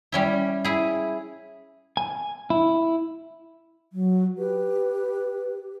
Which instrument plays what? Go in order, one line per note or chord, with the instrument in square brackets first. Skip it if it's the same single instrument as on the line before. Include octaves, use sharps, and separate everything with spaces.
[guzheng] G3 C#4 E4
E4 G#4
[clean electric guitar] G#5
E4
[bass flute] F#3
[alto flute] G4 [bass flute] B4